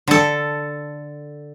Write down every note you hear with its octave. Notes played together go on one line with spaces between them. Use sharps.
D3 A4